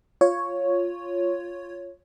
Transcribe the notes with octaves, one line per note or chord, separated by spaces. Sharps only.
F4 C#5